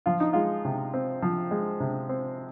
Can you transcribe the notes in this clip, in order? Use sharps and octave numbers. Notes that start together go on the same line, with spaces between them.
F3 F4
D#4
G#3 F4
C3
C4
F3
G#3
C3
C4